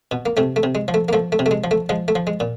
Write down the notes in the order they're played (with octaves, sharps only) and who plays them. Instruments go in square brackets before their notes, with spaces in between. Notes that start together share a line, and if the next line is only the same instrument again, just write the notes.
[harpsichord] B2
A#3
C3 A3
A3
C3
G#3
F3
A3
A#3
F3 A3
A3
C3
A3
G#3
F3
A3
F3 G#3
A3
F3
G#3
A#2